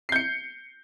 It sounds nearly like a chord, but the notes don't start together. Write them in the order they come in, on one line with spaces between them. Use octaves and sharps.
C7 G6 C#7